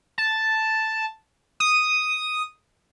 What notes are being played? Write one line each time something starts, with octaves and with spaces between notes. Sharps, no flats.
A5
D#6